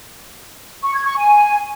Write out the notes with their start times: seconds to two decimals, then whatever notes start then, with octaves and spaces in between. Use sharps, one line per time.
0.83 C#6
0.94 G#6
1.05 C#6
1.16 G#5